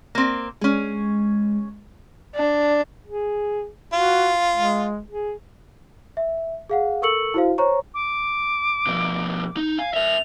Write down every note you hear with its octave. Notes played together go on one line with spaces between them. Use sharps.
A#3 C4
G#3 C#4 G#4
D4
G#4
F4 F#4
G#3
G#4
E5
G#4 F5 F#5
A4 A#4 C#6 E6 C#7 F#7
E4 F#4 C5 F5
C5 C#5 A#5 C#6
D6
B2 F3
D#4
F5 G#5
A#4 E5 F7